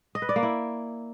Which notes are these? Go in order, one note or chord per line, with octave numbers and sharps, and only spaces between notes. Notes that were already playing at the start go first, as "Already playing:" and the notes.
D#5
B4
D5
A#3
E4